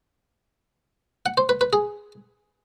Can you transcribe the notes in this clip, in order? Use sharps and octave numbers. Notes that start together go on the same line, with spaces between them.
F#5
C5
B4
B4
G#4